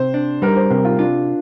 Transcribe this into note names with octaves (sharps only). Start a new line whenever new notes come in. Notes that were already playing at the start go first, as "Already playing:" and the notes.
Already playing: C3 C5
D4
G3 A#4
C5
C3 A#4
F4
D4 F4